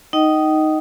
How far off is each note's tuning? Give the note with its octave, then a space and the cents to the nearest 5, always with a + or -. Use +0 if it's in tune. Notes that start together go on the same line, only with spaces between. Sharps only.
D#4 +0 D#5 +0 G5 -40